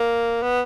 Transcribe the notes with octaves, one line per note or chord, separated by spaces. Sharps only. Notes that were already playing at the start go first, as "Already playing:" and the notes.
Already playing: A#3
B3